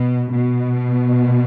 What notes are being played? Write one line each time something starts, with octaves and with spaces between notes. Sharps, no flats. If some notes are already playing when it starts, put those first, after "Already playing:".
Already playing: B2
B2